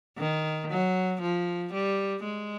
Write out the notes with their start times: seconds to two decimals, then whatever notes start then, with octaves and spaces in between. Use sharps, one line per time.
0.18 D#3
0.70 F#3
1.22 F3
1.74 G3
2.25 G#3